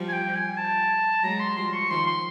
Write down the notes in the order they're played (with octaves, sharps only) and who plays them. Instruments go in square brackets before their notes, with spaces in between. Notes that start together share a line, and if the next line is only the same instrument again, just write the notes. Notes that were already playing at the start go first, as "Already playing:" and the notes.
Already playing: [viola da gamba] F3 G3
[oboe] G#5
G5
G#5
A5
[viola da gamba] F#3 G#3 [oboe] A#5
[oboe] C6
[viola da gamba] F3 G3 [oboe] C6
[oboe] C#6
[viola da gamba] D#3 F3 [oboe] C6
[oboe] C6